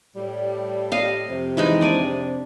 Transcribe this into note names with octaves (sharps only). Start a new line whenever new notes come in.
A2 G3
D#5 F5
F2 C3
E3 G#3 D#4
D4 D5 G#5